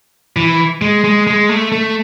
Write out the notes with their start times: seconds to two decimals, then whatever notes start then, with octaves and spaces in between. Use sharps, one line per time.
0.36 E3
0.82 G#3
1.04 G#3
1.27 G#3
1.49 A3
1.72 A3